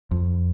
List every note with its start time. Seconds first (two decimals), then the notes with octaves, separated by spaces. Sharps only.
0.11 F2